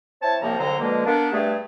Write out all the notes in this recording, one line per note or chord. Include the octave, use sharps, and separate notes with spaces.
C4 E4 C#5 A5
C2 C3 F3 A#3 C#5 A#5
C2 F2 D3 F#3 C5 A#5
B2 D3 F3 G#3 A#3
A#3 B3 D4
G2 A3 G#4